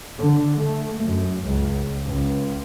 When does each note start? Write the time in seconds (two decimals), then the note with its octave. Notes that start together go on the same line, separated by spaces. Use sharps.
0.17 D3
0.59 A3
1.02 F#2
1.45 C#2
2.05 C#2